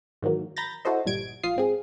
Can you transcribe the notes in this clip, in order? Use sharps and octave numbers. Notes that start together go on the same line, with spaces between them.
G#2 D#3 E3 F#3 A#3
A#5 B5 G6 A6 A#6
E4 F#4 A4 C5 D#5
G1 A#2 G3 G#6 D7
A#1 F4 F5 D#6 C7
G#2 C4 G#4